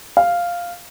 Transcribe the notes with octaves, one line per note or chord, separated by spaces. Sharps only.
F5